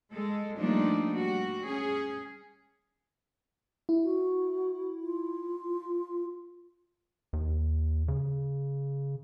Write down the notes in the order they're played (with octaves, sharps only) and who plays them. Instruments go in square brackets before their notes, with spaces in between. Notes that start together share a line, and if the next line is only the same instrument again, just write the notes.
[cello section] G#3 A4
F3 G3 A3 A#3 D4 D#4
G3 F#4
C#4 G#4
[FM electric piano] E4
[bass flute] F#4
F4
[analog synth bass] D#2
C#3